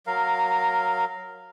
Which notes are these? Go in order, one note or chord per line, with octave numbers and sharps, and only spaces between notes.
F#3 A#4 F5